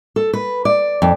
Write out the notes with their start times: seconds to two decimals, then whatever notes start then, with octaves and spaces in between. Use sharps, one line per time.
0.16 A4
0.33 B4
0.65 D5
1.02 F2